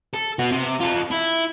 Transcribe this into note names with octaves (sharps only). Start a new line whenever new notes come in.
A4
B3 F#4
C3
F4 A4
E4